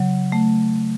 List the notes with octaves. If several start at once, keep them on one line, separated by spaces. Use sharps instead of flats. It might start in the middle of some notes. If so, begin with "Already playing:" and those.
Already playing: C#3 F#3
A3